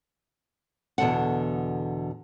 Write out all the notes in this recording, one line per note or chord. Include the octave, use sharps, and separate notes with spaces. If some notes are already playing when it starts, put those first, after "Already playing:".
E2 B2 D3 A4 F#5